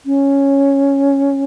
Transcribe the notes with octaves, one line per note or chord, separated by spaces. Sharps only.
C#4